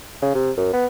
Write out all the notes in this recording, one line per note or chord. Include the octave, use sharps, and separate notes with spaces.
C#3
C3
F#2
B3